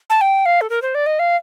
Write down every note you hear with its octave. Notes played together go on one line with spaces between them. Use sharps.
A5
G5
F5
A4
A#4
C5
D5
D#5
F5